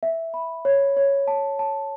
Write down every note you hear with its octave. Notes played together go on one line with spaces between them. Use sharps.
E5
B5
C#5
C#5
A5
A5